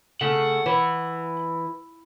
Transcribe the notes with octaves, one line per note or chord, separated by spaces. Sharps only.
C#3 A3 F#5
E3